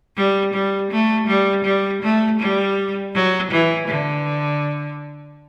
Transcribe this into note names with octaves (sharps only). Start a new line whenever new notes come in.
G3
G3
A3
G3
G3
A3
G3
F#3
E3
D3